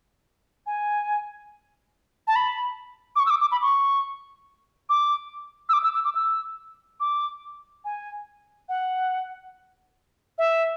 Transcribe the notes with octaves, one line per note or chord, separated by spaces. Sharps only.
G#5
A5
B5
D6
C#6
E6
D6
D6
B5
C#6
D6
E6
D6
E6
E6
D6
E6
D6
G#5
F#5
E5